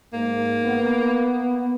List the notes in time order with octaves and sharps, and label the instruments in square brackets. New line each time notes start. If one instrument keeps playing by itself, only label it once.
[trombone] G#2 [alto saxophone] A#3
[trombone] B3